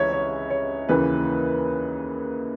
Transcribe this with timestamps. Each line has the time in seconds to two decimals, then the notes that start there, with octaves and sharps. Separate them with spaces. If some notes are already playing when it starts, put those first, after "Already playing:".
Already playing: C#2 C#3 E3 G#3 C#4 C#5 E5
0.13 C#5
0.50 C#5
0.89 D#2 C#3 E3 B4